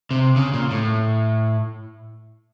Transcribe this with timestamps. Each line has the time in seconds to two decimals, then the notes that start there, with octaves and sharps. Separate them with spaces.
0.11 C3
0.36 C#3
0.54 A#2
0.71 A2